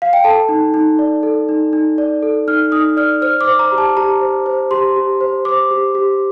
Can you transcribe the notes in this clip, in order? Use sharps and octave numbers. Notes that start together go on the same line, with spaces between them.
F5
G5
A4 A5
D#4
D#4
D5
A4
D#4
D#4
D5
A4
D#4 F6
D#4 D#6
D5 F6
C5 F6
D6
C5
A#5
G4
A5
G4 A#5
C5
C5
G4 C6
G4
C5
C5 D6
G4
G4